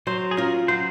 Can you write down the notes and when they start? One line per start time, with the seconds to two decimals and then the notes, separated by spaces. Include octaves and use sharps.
0.07 F#3 C5
0.31 G#4
0.37 C#4 F4 A#4
0.68 F#3 C5